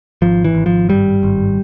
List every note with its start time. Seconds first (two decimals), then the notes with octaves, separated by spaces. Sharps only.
0.22 G#1 F3
0.44 E3
0.55 G#1
0.66 F3
0.89 G2 G3
1.23 G#1